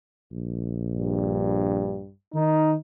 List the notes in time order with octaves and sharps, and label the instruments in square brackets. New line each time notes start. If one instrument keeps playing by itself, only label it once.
[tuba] A#1
[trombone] G2
[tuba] D#3 [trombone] D#4